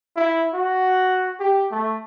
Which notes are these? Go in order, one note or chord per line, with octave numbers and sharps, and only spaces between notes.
E4
F#4
G4
A3